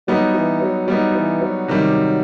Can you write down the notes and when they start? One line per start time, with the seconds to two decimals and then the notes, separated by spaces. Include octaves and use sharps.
0.07 F#3 G3 B3 D#4
0.34 E3
0.62 F#3
0.87 F#3 G3 B3 D#4
1.14 E3
1.41 F#3
1.68 C3 D#3 G3